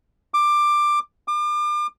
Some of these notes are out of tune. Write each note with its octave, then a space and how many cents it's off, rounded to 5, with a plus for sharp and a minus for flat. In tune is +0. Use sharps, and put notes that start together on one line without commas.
D6 +15
D6 +35